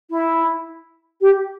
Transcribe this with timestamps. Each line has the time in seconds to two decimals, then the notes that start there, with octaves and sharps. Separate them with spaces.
0.10 E4
1.21 G4